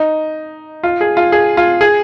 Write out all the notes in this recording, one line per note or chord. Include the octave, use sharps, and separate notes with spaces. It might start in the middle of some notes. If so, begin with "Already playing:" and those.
Already playing: D#4
F4
G#4
F4
G#4
F4
G#4